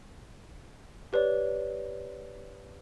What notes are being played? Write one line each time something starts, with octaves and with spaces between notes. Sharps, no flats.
G4 B4 C#5 D5